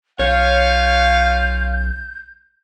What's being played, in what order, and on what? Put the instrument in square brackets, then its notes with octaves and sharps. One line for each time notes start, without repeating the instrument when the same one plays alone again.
[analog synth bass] B1 [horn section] C#4 F4 F5 [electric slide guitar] C#5 [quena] G6